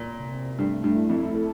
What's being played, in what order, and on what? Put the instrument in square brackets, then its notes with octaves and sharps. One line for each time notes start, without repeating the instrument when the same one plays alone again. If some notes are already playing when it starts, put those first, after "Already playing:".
Already playing: [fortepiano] A#2
[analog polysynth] C3
[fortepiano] G2 [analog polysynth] A3
[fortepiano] G2
[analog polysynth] E4
[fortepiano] F2
[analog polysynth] A4